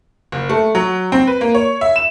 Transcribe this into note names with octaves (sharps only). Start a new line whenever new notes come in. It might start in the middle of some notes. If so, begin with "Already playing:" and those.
F#1
A3
F#3
C4
B4
A#3
C#5
E5
E7